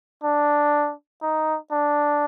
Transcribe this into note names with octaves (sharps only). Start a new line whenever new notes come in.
D4
D#4
D4